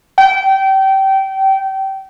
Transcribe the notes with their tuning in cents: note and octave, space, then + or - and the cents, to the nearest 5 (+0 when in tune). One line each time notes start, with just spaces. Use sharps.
G5 -25